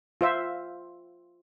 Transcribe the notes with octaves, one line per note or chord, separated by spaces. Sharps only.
F4 C5 E5